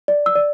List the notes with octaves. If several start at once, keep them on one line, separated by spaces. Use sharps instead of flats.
D5
E6
D5